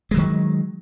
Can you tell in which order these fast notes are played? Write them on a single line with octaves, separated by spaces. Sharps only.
G#3 F#3 D#3